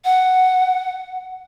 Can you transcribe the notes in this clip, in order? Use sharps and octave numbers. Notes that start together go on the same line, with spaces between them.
F#5